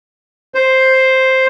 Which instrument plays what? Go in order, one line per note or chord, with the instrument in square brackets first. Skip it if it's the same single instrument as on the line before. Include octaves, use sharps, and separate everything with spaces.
[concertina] C5